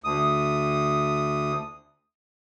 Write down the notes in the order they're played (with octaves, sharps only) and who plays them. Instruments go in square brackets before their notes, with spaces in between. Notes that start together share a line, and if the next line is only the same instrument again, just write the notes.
[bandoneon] D2 D#6